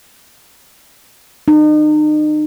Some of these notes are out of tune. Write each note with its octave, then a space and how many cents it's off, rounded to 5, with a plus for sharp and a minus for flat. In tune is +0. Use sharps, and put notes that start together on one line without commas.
D#4 -40